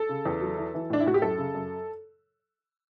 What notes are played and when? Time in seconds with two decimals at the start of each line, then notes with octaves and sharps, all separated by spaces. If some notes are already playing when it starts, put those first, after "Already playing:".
Already playing: A4
0.09 C#3
0.26 E2
0.42 F#3
0.58 E3
0.74 E3
0.90 A2 D4
1.00 E4
1.06 A2 F#4
1.14 G4
1.22 F#2 A4
1.38 C#3
1.55 F#2